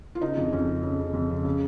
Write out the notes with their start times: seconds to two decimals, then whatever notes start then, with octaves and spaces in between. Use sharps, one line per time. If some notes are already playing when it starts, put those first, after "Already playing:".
0.15 F4
0.21 C#3 D#4
0.37 F2
0.53 F2 C#4
0.67 C#3
0.83 C#3
0.99 C#3
1.14 F2
1.30 C#3
1.45 C#3